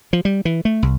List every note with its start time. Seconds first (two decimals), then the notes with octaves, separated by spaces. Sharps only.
0.13 F3
0.25 G3
0.45 E3
0.65 A3
0.83 C2